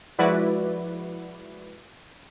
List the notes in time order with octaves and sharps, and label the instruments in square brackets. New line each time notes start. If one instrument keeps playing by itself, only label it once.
[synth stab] F3 G#3 E4 F#4 B4 D5